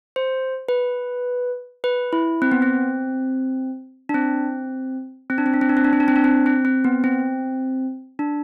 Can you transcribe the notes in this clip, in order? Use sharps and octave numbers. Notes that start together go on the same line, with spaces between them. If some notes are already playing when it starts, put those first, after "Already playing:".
C5
B4
B4
E4
C4
B3
C4
D4
C4
C4
D4
C4
D4
C4
D4
C4
D4
C4
D4
C4
D4
C4
C4
C4
B3
C4
D4